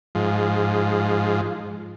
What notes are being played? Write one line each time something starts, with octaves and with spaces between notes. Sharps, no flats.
G#2 F3